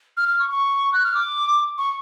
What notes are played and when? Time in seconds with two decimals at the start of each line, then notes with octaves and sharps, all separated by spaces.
0.17 F6
0.28 F6
0.39 C#6
0.50 C#6
0.93 F#6
1.04 F6
1.14 D6
1.78 C#6